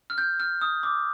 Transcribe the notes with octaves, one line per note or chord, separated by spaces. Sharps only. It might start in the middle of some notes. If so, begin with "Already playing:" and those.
F6
G6
F6
D#6
D6